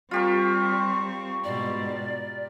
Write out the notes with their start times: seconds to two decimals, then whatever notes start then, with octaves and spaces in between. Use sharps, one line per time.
0.11 G3 C4 F4 G4 A#4 C#6
1.44 G#2 B2 D5